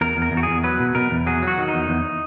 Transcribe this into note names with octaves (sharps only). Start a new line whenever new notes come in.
E2 A#4
E2
A#4
E2
F#4
G#4
E2
F#3 B4
B2
B2 A#4
E2
F#3 G#4
F#3
F#4
D#3
D#4
E2
E2